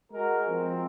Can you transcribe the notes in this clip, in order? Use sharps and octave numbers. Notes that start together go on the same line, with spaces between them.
G#3 F#4 A#4
F3 C4